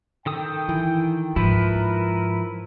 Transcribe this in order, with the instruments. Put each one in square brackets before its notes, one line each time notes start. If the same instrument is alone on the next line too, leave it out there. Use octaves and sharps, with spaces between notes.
[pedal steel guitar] D#3 A4 D#6 [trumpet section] G5
[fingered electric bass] E3
[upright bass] G#2 [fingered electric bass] F3 [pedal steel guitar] E4 B4 [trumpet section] A#4